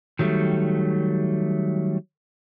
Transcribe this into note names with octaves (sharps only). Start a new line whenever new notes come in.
D#3 F#3 G3 A3